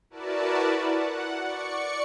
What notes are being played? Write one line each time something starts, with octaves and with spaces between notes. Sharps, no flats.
E4 F#4 A#4 B4 D5 A5
F#5
D5 C#6 C#7